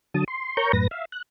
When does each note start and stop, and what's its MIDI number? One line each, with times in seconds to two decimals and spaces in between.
0.14 0.24 50
0.14 0.24 54
0.14 0.24 81
0.14 0.24 87
0.28 0.56 84
0.57 0.72 70
0.57 0.72 73
0.57 0.72 82
0.57 0.72 85
0.57 0.72 91
0.73 0.87 42
0.73 0.87 45
0.73 0.87 71
0.73 0.87 94
0.91 1.05 76
0.91 1.05 77
1.12 1.22 90